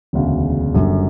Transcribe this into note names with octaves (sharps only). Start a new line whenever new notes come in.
E1 D2 C#3
F#1 F#2 D3 G3